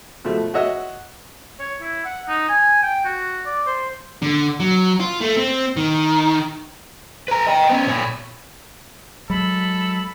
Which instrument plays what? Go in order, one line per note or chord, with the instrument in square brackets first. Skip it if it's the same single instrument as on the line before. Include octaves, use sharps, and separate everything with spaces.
[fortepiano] B2 F3 A3
F#4 C#5 D#5 E5 F#5
[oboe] C#5
E4
F#5
D#4
G#5
G5
F#4
D5
C5
[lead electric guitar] D3
F#3
F4
A3
C4
D#3
[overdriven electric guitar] B4 A#5
D#5 G5
B3 C#4
A#2 C#5
[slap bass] F#3 G#3 [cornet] A4 [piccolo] B5